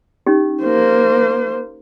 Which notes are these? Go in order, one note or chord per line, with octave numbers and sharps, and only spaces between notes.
C#4 D#4 G4
A#3 C5